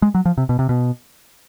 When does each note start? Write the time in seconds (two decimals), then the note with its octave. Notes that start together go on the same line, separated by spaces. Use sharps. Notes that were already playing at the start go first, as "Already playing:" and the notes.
0.02 G#3
0.15 F#3
0.26 F3
0.38 C3
0.49 B2
0.59 C3
0.69 B2